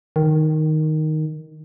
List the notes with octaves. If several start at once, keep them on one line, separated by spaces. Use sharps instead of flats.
D#3